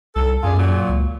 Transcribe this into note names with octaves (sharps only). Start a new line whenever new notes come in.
C2 A4
F#2 D4 F4 G#4
A#2 F#3
C#2